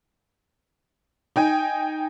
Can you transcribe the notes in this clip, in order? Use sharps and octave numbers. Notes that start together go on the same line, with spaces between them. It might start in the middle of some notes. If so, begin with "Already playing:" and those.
D#4 G5 G#5